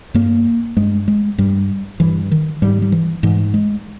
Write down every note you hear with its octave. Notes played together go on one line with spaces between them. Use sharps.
G2 A#3
G2 G#3
G#3
G2 G3
G2 E3
D#3
G#2 G3
G3
E3
G#2 E3
G#3